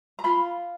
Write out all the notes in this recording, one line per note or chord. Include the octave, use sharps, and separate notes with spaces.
A#5
F4 B5